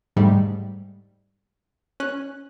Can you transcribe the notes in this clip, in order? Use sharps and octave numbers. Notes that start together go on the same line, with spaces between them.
G#2 G3 A3
C#4 F#6